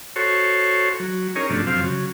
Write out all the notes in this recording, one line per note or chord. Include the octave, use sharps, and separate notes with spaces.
F#4 A4 C5 C#5
F#3
C#4 D#4 G#4 A#4 C#5
G2 C3 F3 A3 D4
F#2 C3 F3 C4 F5
C#3 F#3